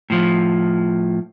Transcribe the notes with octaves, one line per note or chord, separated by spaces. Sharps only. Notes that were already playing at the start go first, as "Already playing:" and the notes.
A2 F3